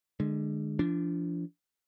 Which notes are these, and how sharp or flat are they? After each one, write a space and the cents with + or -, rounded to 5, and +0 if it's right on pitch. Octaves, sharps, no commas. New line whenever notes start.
D3 +30 G#3 +10
F3 -30 D4 -15